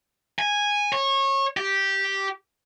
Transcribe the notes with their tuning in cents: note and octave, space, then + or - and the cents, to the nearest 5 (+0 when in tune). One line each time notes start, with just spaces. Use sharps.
G#5 -10
C#5 -25
G4 -5